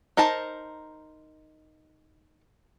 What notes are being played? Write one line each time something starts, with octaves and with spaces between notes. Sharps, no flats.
D#4 A#4 C5 A5